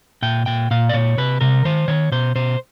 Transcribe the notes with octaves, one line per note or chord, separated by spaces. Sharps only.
A#2 G5
A#2 G5
A#2 F5
D5
A#2 C#5
C3 B4
C3 A#4
D#3 C5
D#3 C#5
B2 C5
B2 C5